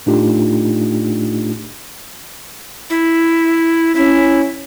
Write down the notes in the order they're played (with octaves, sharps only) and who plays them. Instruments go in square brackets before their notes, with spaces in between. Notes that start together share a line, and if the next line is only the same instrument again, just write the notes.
[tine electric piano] A2 A3 D4 D#4 F4 G4
[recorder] E4
[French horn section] C#4 [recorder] E4